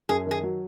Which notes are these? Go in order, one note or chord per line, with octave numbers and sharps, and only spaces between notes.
F#2 G#4
D#3
G#4
F#3